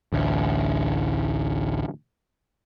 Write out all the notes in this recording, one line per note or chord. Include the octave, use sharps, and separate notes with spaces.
A1 D2